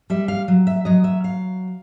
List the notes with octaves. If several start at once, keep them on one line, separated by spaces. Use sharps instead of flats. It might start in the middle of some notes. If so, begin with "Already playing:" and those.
G3 E5
F5
F#3
E5
F#3 D#5
E5
F5